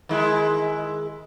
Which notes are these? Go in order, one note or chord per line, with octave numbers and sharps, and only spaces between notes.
D#3 G#3 E4